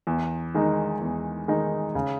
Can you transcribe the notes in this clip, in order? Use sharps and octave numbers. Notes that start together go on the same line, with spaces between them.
E2
D#3 G#3 D#4
E2
D#3 G#3 D#4
C#3